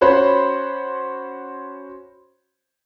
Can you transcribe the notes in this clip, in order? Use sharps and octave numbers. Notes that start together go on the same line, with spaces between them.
C#4 F#4 C5 C#5 B5